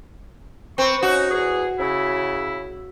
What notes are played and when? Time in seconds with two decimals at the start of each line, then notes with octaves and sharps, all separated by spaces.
0.78 C4 B4 C#6
1.03 C#4 D#4 F#4
1.30 E2 G#4
1.79 C#3 E4